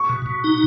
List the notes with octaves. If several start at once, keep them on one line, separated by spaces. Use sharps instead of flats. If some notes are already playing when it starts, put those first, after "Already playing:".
Already playing: C#6
B2
B2
D#4